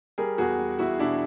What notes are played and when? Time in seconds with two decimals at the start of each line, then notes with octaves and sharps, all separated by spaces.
0.18 G3 G#4 A#4
0.38 E2 F#4 G#4
0.58 G3
0.79 E2 E4 F#4
0.99 B2 D4 E4